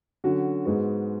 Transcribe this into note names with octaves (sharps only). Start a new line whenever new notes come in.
D3 F#3 C#4 F#4
G#2 G#3 B3 F#4